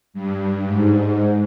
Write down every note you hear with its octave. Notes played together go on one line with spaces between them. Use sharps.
G2
G#2